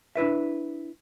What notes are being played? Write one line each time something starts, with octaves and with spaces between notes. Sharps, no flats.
D4 E4 B4 E5